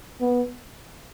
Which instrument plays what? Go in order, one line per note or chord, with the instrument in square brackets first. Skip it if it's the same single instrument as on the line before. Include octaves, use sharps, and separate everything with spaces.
[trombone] B3